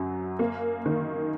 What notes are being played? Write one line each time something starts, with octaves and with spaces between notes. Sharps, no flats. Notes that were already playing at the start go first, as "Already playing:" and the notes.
Already playing: F#2 F#3
A#3
D#3